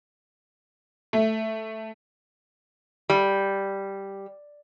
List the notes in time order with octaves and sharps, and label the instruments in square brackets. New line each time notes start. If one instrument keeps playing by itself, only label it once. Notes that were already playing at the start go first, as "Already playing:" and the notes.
[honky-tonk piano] A3
[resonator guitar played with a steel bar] G3